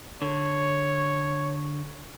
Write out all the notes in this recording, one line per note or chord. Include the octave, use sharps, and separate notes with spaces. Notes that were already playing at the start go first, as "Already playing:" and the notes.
D3 C#5